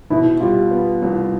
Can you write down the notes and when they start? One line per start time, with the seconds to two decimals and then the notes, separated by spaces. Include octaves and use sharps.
0.10 B2 E4
0.40 G3 F4
0.71 B3
1.02 C2